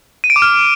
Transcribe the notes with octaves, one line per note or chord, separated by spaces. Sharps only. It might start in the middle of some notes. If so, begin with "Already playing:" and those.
D#7
D7
D6
F6